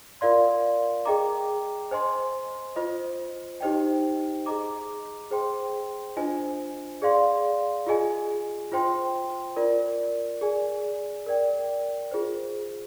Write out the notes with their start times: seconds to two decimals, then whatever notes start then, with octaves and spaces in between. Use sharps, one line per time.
0.21 F4 A#4 D5 F5 C6
1.05 G#4 D#5 G5 A#5 D6
1.91 C5 D#5 G#5 C6
2.76 F4 C5 D#5
3.61 D#4 G4 C5 D#5 G5
4.46 G#4 D#5 A#5 D6
5.31 G#4 C5 G5 C6
6.16 D4 F4 C5 D#5 G#5
7.02 G#4 D5 F5 C6
7.86 F4 G#4 D#5 G#5
8.72 F4 C5 G5 C6
9.56 F4 A#4 D5
10.41 G#4 D5 G#5
11.26 A#4 D5 G5
12.11 F4 G#4 C5